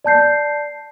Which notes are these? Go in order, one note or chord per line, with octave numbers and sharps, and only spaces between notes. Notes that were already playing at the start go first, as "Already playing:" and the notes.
D5 A5 G6 C7